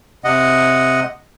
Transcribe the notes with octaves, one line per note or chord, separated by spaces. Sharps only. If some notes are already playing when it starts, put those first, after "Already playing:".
C3 D#5 F#5